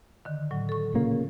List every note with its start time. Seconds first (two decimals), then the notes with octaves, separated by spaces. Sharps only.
0.25 D3 D#3
0.51 A2 F#3
0.69 A4 C#6
0.94 A#2 C#3 A#3